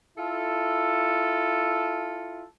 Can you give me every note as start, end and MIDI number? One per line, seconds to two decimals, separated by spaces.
0.18 2.43 64
0.18 2.43 65
0.18 2.43 69